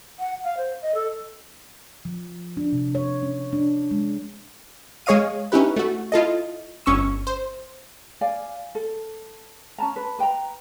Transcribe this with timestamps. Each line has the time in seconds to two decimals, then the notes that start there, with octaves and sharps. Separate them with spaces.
0.19 F#5
0.44 F5
0.57 C5
0.82 D#5
0.95 A4
2.05 F3
2.57 D4
2.72 C3
2.95 C#5
3.22 C#4
3.53 D4
3.91 G#3
5.06 G#3 G#4 C#5 D#5 F5 D#7
5.52 C#4 D#4 E4 G4 B4
5.76 A3 F#4
6.12 E4 F4 A4 D#5
6.86 G1 C#4 C#6 E6
7.27 C5
8.21 D5 F5 G#5
8.75 A4
9.78 C#4 A5 A#5
9.96 B4
10.19 B4 G5 A5 A#5